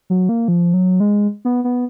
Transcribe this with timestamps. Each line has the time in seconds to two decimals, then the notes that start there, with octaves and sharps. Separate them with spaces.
0.10 F#3
0.29 A#3
0.48 F3
0.74 F#3
1.00 G#3
1.45 B3
1.64 B3